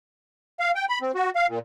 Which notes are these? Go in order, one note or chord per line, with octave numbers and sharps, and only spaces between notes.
F5
G5
B5
C4
F#4
F5
A#2